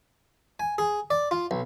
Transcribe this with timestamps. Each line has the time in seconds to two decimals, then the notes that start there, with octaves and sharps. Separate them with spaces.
0.60 G#5
0.78 G#4
1.10 D5
1.31 F4
1.51 B1